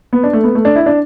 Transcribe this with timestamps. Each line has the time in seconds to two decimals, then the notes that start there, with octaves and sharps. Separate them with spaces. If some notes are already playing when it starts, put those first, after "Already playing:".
0.13 B3
0.23 D4
0.33 A3
0.44 B3
0.55 A3
0.65 D4
0.76 E4
0.86 D4